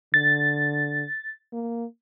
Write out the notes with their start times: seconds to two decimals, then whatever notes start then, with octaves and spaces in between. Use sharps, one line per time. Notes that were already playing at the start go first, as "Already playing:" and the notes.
0.14 D3 A6
1.53 A#3